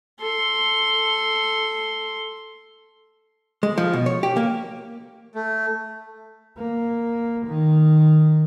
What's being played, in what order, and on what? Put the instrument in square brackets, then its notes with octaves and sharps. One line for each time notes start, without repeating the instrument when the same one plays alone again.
[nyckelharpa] A4 C6
[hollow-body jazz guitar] G#3
F3
B2
C#5
G4
A#3
[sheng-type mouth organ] A3
[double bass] A#3
D#3